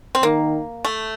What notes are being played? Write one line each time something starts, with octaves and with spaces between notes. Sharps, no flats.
C4
D#3 A#3
A3